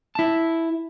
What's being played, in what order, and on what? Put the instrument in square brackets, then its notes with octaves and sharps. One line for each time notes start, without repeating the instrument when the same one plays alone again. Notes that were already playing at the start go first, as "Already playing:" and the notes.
[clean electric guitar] E4 A5